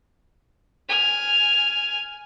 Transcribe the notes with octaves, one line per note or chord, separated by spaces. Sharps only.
G#5 F6